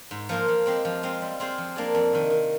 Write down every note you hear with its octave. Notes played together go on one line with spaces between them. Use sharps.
G#2
F3 A#3 F4
F3
G#3 C4 G4
F3
G#3 C4 F4
G3
C4 F4 G#4 C5
F3
A#3 D4 G#4 D5
F2
C3 D#3
D#3